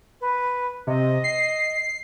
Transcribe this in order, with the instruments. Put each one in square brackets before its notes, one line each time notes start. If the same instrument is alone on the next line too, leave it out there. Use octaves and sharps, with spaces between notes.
[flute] B4
[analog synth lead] C3 [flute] D#5
[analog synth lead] C7